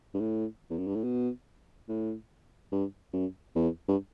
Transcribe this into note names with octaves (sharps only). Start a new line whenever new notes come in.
G2
A2
E2
F#2
G2
A2
B2
A2
G2
F#2
E2
G2